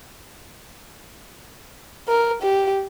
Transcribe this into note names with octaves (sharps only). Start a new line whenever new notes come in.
A#4
G4